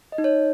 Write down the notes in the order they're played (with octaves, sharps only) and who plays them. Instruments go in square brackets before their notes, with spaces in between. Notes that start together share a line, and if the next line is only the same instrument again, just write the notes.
[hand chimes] D#5
D#4
C#5